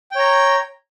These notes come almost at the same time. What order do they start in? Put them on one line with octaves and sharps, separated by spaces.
G5 C#5 A#5